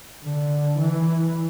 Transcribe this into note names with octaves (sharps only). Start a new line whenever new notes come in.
D3
E3